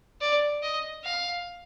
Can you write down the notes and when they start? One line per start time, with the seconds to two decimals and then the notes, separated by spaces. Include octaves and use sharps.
0.21 D5
0.63 D#5
1.04 F5